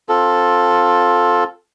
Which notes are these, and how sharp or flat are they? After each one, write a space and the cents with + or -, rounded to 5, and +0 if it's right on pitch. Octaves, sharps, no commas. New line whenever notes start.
C4 +20 F4 +10 A4 +0